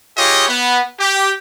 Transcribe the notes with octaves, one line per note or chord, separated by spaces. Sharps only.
F4 G4 G#4 C#5 D#5
B3
G4